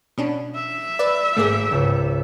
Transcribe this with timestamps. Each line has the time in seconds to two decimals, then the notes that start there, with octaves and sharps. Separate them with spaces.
0.18 B2 C#4 D4
0.55 E5
0.99 B4 D5
1.37 G#1 A3 A#3 G#4 D6 E6
1.71 G#1 C#2